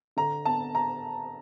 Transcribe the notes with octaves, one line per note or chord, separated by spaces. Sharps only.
D3 A#5
B3 A5
A#5